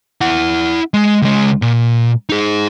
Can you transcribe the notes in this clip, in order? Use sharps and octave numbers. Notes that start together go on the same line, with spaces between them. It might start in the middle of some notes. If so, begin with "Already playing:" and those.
E4 F#5
G#3
C#2 G#3
A#2
D#4 G#4